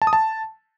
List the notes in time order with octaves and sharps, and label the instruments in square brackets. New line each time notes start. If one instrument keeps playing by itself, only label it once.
[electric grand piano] A5
D#6
A5